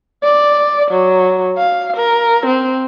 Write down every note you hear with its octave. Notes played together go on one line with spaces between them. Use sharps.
D5
F#3
F5
A#4
C4